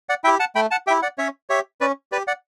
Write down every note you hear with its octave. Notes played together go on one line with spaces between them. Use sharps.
D5 F#5
E4 G4 E5 G5
F#5 A5
A3 G5 B5
F#5 A5
E4 G4 E5 G5
D5 F#5
C#4 C#5 E5
G4 C#5 E5
C#4 B4 D5
G4 B4 D5
D5 F#5